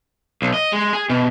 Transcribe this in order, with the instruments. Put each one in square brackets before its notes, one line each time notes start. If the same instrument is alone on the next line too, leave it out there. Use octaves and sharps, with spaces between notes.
[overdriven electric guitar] B1
D#5
G#3
G#4
B2